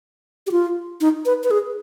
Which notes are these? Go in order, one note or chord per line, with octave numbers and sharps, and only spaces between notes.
G4
F4
D#4
B4
B4
G#4